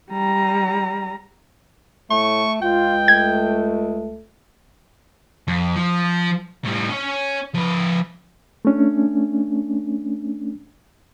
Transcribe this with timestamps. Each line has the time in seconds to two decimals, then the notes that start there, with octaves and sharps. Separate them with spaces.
0.11 G3 A#5
2.10 A2 A3 C#6
2.62 C#2 F4 G5
3.08 A3 G#6
5.48 F2
5.76 F3
6.65 A2 G3
6.90 C#4 C#5
7.54 F3 B4
8.65 A3 C#4 D4